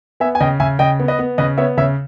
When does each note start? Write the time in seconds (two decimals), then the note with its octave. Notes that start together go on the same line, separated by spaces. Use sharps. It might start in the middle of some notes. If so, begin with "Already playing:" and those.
0.20 B3 E5 G#5
0.35 G#5
0.40 C#3 D#5 G5
0.60 C#3 E5 G#5
0.79 C#3 D#5 G5
1.00 B3
1.08 B4 D#5
1.19 B3
1.38 C#3 B4 D#5
1.57 B3 C#5 E5
1.77 C#3 C#5 E5